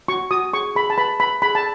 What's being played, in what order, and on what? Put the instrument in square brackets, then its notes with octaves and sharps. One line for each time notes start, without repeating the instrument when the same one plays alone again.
[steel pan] F#4 C#6
F#4 D#6
G#4 C#6
G#4 B5
A5
B4 B5
B4 B5
G#4 B5
A5